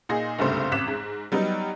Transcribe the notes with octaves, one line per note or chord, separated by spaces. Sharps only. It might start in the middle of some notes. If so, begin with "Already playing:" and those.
A#2 D#4 G#4 C6 A#6
F#1 C2 G2 A3 C5
A1 F2 D6 F#6 B6 E7
G#2
F#3 G3 B3 D#4